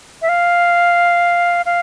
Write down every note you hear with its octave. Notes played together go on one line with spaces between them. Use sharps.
E5
F5
F5